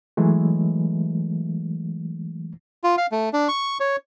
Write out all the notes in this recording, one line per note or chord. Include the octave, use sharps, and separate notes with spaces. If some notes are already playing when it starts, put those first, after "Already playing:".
E3 F#3 G#3 A3
F4
F5
A3
D4
C#6
C#5